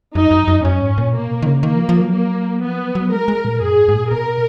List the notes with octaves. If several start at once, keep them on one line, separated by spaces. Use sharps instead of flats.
F#2 D#4
F#2
F#2
F#2 C#4
G#2
A#2
B2 A#3
D#3
C#3
D#3 A#3
F3
F3
F#3
A#3
F3 B3
F#3
F#3
G#3 A#4
G#3
A#2
F#2 G#4
G#2
G#2
A#2
B2 A#4